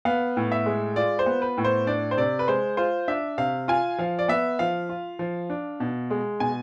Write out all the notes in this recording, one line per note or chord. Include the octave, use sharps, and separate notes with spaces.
B3 F5
A2
E5
G#3
F4 D5
C5
B3
B4
A2
C5
D4 D5
C5
C3 D5
B4
G#3 C5
F4 C5
D4 E5
C3 F5
F4 G#5
F3 F5
D5
B3 E5
F3 F5
F4
F3
D4
B2
G#3
B2 G#5